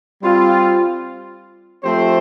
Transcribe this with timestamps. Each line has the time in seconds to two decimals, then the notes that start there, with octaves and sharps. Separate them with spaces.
0.20 G3 C4 F4
1.82 F3 A3 C4 G4 C5